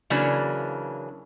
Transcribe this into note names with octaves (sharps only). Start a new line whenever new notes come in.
C#3 E3 F#3 A#3 D4